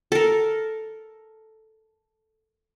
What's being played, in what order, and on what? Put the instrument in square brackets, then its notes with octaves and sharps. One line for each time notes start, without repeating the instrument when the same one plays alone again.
[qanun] A4 A#4